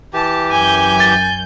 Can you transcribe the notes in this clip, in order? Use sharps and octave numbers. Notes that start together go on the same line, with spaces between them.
E3 G4 A5
F#2 G#5 G6
A6